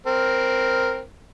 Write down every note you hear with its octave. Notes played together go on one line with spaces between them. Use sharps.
C4 A#4